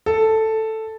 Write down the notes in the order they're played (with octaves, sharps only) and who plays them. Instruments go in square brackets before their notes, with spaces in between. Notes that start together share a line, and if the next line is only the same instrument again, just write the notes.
[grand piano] A4